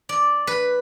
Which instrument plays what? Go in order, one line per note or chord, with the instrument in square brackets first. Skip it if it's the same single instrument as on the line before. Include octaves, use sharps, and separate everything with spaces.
[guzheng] D5
B4